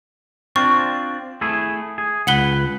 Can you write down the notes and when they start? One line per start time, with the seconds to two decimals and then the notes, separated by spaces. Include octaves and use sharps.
0.56 C4 D4 F4 C#6
1.41 A3 E4 G#4
1.98 G#4
2.27 C#2 B4 F#5 F#7 G7